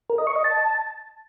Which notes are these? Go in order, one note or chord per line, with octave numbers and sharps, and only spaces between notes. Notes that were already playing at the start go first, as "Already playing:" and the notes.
A#4
D#5
C#6
D#5
A5